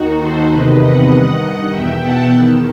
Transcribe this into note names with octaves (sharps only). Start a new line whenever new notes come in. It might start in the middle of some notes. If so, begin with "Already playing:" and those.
Already playing: D#2 D#3 D#4 F#4
A4 C5
E2 C3 D#3 B4 D#5
D#5 F#5
G2 D#3
E2 B2 E5 G5
F#5 A5
E2 D#3